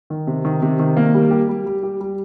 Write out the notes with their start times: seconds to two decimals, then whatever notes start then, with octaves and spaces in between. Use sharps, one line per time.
0.10 D#3
0.27 C3
0.45 D#3
0.62 C3
0.79 D#3
0.97 A#3
1.14 G3
1.31 G4
1.49 G3
1.66 G3
1.83 G4
2.01 G3